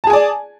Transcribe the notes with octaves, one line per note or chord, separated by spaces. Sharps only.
G#4 D5 G#5 A5